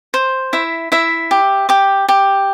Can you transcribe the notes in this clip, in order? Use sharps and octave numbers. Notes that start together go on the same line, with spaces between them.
C5
E4 E5
E4 E5
G4
G4 D6
G4